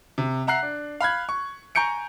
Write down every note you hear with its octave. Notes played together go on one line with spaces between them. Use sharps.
C3
E5 F#5 A#5 F#6 C7
D4
F5 B5 F#6 G#6
C#6
G#5 A#5 C#6 G6 C#7 D7